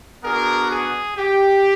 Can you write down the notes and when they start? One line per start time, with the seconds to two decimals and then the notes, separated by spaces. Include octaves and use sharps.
0.23 B3 D4 F#4 G#4 A#4
0.70 G#4
1.17 G4